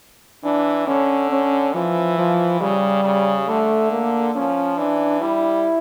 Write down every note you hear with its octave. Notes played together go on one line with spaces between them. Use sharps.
E3 D4
D3 C#4
C#4
E3 F3
F3
C#3 G3
C#3
D3 A3
A#3
F3 C#4
E3 D4
G3 E4